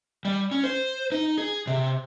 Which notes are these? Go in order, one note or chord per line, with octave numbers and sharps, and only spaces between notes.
G3
C#4
C5
D#4
G#4
C3